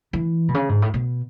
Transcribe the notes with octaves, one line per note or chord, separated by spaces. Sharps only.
E3
B2
C#3
G#2
A2
B2